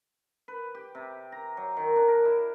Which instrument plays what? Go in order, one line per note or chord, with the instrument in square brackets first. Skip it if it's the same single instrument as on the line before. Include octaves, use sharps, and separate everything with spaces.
[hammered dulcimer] B4
G4
C3
A#5
F#3
D#3
D4
A#4
E4